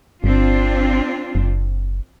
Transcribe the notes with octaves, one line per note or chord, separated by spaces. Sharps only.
G1 C4 D4 F4
F#1